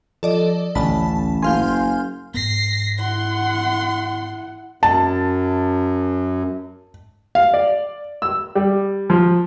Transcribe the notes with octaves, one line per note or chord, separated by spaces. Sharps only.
F3 A4 D5 D#5
A1 D2 C#4 A5 B5
F#1 F5 G#5 C6 F6 G6
G#2 B3 A#6 C7
E4 F#5 C6
F#2 A5
F5
D5
E6
G3
F3